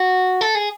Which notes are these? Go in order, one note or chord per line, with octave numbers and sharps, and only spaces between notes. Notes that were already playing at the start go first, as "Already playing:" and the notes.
Already playing: F#4
A4
G#4